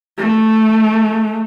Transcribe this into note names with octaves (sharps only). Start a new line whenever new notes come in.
A3